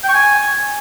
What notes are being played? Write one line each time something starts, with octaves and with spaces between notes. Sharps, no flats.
G5
C#6
G#5